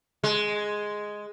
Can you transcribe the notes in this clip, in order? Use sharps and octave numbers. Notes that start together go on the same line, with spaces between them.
G#3